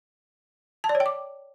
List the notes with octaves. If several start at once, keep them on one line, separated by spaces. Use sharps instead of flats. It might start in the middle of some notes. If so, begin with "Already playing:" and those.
A5
D5
C#5
G5
D6